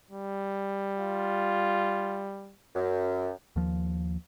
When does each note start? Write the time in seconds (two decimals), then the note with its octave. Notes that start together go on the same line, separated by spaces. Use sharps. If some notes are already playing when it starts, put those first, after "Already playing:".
0.11 G3
0.99 F4
2.75 F#2
3.56 D#2 F3